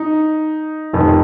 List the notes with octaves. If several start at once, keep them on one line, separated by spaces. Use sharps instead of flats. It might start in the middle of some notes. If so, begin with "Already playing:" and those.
Already playing: D#4
F1 F2 D#3